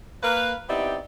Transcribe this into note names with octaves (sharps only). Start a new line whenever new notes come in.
A#3 B4 F5
B3 C4 D#4 E4 G4 D5